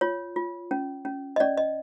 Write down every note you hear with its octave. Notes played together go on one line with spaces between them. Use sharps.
F4 C#5
F4
C#4
C#4
D#5
C#4 D5
D#5